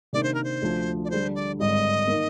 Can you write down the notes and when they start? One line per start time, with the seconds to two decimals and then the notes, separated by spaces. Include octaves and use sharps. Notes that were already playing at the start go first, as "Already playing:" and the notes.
0.13 C3 D#3 A#3 D4 D5
0.23 C5
0.34 A#4
0.44 C5
0.62 D2 D3 F3
1.04 D5
1.10 D3 G3 D4 C5
1.35 D5
1.59 G#1 G2 D3 G3 D#5
2.07 D#3 A#3